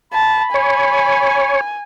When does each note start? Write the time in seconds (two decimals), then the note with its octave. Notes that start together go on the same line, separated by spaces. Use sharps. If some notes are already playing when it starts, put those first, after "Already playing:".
0.13 A5 B5
0.54 C#5 G#5